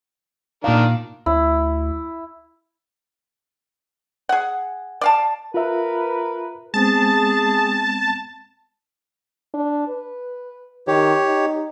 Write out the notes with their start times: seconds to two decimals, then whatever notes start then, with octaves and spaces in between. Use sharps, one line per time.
0.64 A#2 D#3 D4 A#4 F5
1.26 D2 E4
4.29 G#4 F#5
5.01 D5 F5 A5
5.54 F4 A#4 B4 E5
6.74 G#3 B3 C4 G#4 A5
9.54 D4
9.88 B4
10.87 D#3 G4 C#5
11.26 D#4